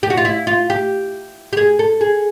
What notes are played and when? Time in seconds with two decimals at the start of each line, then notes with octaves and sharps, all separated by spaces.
0.03 G4
0.10 F#4
0.17 F4
0.25 E4
0.47 F4
0.70 G4
1.53 G4
1.57 G#4
1.79 A4
2.01 G#4